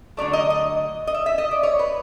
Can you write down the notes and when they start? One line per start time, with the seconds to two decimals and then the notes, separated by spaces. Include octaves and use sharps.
0.17 D3 F#3 A3 D5
0.33 D#5
0.50 D#5
1.07 D#5
1.15 E5
1.26 E5
1.38 D#5
1.51 D5
1.63 C#5
1.79 B4